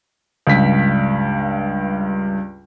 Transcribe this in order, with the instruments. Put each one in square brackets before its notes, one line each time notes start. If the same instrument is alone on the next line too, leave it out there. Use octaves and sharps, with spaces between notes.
[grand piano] C#2 G2 B6